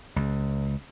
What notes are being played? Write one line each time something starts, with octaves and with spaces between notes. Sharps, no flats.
C#2